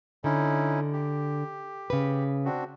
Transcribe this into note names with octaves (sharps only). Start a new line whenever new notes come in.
D3 C#4 D#4 E4
G4
C#3 B4
C4 D4 F#4